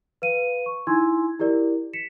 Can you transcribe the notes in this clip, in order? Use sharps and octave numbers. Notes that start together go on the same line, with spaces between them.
B4 F5 D#7
C#6
D#4 E4 G#5 C6 E6 G#6
E4 G4 A#4 D5
B6 C#7 E7